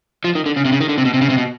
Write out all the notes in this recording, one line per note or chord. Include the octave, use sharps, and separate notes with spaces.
F3
D#3
D3
C#3
C3
C#3
D#3
D3
C3
B2
C3
C#3
C3
B2